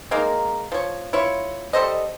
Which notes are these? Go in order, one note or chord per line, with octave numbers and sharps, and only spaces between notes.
G#3 A#3 D#4 A#4
F3 C#5
E4 F4 C#5
G3 A4 C5 D#5